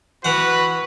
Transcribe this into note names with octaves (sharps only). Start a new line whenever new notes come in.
E3 F#4 B4 F#5